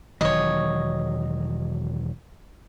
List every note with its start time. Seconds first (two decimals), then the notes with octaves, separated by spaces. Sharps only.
0.21 E1 D#3 F#3 C#5 D#5